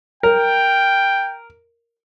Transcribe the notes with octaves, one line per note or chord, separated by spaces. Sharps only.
A#4 G5